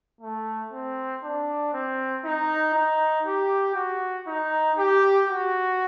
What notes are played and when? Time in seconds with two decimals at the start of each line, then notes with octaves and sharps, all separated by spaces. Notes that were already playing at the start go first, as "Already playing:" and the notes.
0.21 A3
0.72 C4
1.23 D4
1.73 C4
2.24 D#4
2.75 D#4
3.26 G4
3.76 F#4
4.27 D#4
4.78 G4
5.28 F#4